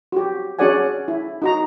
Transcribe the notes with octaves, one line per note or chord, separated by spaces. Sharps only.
F#4 G4
C#4 F#4 G#4 D5 F#5 G#5
E4
D#4 F#4 A#5